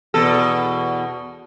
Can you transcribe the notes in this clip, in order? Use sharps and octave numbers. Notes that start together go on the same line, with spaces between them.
E2 B2 A4